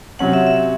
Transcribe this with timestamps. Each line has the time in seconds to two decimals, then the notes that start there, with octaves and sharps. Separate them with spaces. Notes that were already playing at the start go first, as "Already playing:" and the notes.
0.19 C3 F#3 C#4 F#5
0.33 E5
0.47 E5
0.60 E5